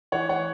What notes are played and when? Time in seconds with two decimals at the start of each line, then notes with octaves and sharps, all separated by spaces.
0.12 E3 C#5 F#5
0.29 C#5 F#5